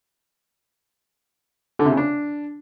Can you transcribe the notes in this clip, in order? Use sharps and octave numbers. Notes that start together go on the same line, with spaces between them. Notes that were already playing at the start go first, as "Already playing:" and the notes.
D3
C3
C#3
D4